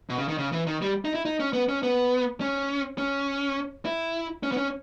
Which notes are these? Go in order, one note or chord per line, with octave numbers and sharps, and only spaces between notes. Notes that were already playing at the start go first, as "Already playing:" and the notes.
B2
C#3
D#3
C#3
E3
D#3
G3
D#4
E4
D#4
C#4
B3
C#4
B3
C#4
C#4
E4
C#4
B3
C#4